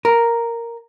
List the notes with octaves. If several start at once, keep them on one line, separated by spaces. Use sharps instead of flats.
A#4